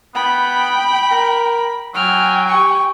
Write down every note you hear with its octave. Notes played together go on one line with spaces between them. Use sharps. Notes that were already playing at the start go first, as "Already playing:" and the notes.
B3 G5 B5
A#4
F#3 G5 G#5 F6
G4 C#6